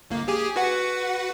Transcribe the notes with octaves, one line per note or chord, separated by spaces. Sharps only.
G1 A#3
G4 G#4 G#5
F#4 B4 F#5